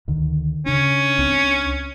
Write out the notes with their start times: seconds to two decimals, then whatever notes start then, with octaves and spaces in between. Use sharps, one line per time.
0.08 D2 D3 D#3
0.66 C#3 C#4 D4
1.18 C#2 C4 D4